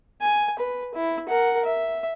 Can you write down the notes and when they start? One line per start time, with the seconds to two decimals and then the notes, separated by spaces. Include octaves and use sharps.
0.21 G#5
0.59 B4
0.95 E4
1.29 A#4 F#5
1.65 E5